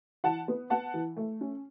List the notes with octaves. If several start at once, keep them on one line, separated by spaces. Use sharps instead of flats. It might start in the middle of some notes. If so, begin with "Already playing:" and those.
E3 F#5 A5
B3
B3 F#5 A5
E3
A3
C#4